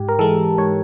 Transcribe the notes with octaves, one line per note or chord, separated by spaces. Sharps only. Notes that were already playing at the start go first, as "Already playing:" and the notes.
Already playing: G#2 G4
A#4
E3 G#3 A4
G#2 C#5